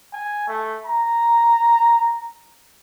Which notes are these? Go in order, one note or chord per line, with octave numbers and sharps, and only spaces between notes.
G#5
A3
A#5